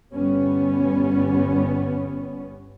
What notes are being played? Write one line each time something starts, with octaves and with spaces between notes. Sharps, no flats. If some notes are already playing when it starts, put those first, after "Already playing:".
G1 G3 B3 C#4